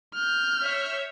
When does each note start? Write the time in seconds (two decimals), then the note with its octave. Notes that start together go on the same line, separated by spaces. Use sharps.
0.14 F6 G6
0.63 C#5 E5